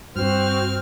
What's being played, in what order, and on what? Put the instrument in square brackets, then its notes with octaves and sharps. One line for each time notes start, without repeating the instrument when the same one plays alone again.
[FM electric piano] G2 [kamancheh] C4 [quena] F#4 [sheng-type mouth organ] F6